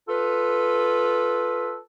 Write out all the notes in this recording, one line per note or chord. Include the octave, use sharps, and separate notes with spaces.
F4 A4 B4